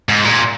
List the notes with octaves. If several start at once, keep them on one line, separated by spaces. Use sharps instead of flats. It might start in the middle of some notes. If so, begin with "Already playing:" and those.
G#2
A#2